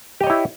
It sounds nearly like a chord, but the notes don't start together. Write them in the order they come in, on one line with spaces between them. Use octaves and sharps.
G4 D#5 C#5 E4